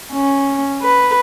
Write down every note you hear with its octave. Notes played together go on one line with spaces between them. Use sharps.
C#4
B4